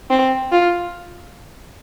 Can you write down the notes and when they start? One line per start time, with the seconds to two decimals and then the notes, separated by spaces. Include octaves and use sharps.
0.10 C4
0.52 F4